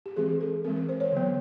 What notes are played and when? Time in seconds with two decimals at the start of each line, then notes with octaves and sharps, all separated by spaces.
0.06 G4
0.16 E3 G#3 C4 G#4
0.41 A4
0.64 E3 G#3 C4 A#4
0.76 A#4
0.89 C5
1.00 C#5
1.12 D3 F#3 B3